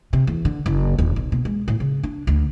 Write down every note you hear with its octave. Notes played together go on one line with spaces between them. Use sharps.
C3
E2
D3
F#1
D#1
B1
B2
G#3
A2
C#3
D4
D2